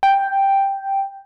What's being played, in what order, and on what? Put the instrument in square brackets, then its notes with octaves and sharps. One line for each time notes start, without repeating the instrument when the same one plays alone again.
[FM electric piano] G5